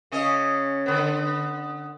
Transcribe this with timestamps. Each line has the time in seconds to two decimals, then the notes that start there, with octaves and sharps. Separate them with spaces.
0.12 C#3 C#4 D#5
0.86 D3 B3